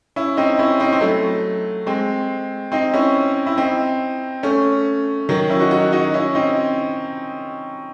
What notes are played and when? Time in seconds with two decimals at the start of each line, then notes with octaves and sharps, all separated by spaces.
0.16 C#4 E4
0.37 C4 D#4
0.59 C#4 E4
0.80 C4 D#4
0.93 C4
1.01 F#3 A3
1.87 G#3 C4
2.72 C4 D#4
2.94 C#4 E4
3.46 E4
3.57 C4 D#4
4.43 A3 C#4
5.29 D#3 F#3
5.50 C#4 E4
5.60 D#4 F#4
5.71 D#4 F#4
5.92 D#4 F#4
6.14 C#4 E4
6.35 C4 D#4